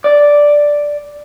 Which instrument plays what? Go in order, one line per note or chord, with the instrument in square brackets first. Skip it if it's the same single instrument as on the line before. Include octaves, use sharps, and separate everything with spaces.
[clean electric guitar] D5